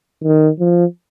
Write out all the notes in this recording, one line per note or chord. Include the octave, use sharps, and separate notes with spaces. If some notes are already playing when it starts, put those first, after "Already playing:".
D#3
F3